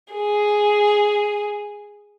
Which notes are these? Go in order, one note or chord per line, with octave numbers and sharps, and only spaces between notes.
G#4